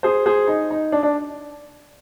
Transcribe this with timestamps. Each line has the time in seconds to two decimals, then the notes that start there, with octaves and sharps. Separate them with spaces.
0.03 G#4 C5
0.26 G#4 C5
0.48 D#4
0.71 D#4
0.92 D4
1.03 D4